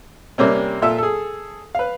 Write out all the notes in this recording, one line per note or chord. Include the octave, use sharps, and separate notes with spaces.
C3 G3 A#3 C4 C#4
A#2 F4 A4 E5
G#4 A4
B4 F5